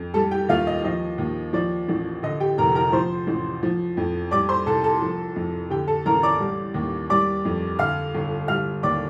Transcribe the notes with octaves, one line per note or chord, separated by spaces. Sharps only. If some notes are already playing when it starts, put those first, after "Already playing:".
Already playing: F2
G3 A4 A5
G4 G5
D#2 F4 F5
D#5
F3 D#5
D#2
F3 D5
A1
D3 D#5
G4 G5
F1 A#4 A#5
A#4 A#5
F3 C5 C6
A1
F3
F2
G3 D5 D6
C5 C6
C2 A4 A5
A4 A5
F3
F2
D3 G4 G5
A4 A5
A1 A#4 A#5
D5 D6
G3
D#2
G3 D5 D6
F2
D3 F5 F6
G1
G3 F5 F6
D#2 D5 D6